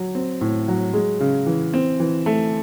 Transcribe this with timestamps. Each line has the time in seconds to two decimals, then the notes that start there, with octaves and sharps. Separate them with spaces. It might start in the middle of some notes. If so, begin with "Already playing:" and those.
Already playing: F#3
0.15 C4
0.41 A2
0.68 F#3
0.93 G#3
1.20 C#3
1.46 E3
1.74 C4
2.00 E3
2.26 A3